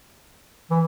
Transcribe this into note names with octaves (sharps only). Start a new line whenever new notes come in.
E3